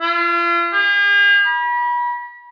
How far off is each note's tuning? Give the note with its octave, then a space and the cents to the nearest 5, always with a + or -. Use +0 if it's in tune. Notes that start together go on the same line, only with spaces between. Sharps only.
F4 -35
G#4 -45
B5 -35